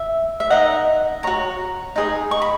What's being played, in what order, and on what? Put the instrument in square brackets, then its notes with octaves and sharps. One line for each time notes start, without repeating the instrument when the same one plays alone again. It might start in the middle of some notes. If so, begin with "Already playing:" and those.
Already playing: [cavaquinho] E5
E5
D#4 A#4 D#5 F#5
F#4 C#5 A#5
D#4 G#4 B4 D#5
C#6
B5